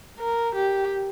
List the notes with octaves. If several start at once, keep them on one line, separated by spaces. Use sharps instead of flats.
A#4
G4